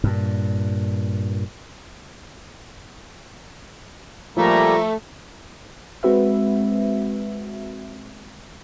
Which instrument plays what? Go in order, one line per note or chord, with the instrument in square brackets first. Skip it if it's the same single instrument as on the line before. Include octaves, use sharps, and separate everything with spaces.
[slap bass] G2 A#2
[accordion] A#2 G3 A#3 [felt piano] F3 [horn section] A3 [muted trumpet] A#5
[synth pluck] G#3 C4 F#4 B4 E5